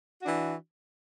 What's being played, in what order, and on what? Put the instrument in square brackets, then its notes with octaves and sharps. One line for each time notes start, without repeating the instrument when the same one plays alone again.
[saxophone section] E3 D4 F#4